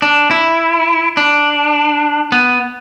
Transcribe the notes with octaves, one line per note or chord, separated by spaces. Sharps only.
D4
E4
D4
B3